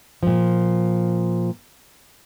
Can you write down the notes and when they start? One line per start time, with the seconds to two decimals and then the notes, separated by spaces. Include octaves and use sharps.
0.23 A#2 F3